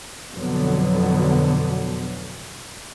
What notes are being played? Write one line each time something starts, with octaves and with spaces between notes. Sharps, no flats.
F2 B2 D3 F#3 B3